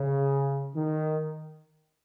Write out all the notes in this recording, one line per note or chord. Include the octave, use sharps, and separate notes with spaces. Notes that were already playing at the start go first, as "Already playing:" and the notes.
Already playing: C#3
D#3